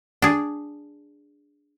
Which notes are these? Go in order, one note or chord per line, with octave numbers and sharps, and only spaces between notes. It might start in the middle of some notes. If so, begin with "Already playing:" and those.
D4 G#4